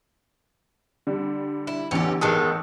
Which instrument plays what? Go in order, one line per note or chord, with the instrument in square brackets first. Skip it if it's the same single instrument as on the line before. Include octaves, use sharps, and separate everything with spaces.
[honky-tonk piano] D3 G3
[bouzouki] E4
[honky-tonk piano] A1 E2 D3 [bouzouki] C#4 G4
[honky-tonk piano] A1 A5 D#6 [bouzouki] D#3 G#3 B3